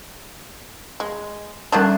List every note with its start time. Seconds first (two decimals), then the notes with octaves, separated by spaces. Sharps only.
1.00 G#3
1.72 D3 D#3 G3 D4 F#6